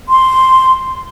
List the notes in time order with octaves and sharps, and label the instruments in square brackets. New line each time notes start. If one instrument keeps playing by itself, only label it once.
[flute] C6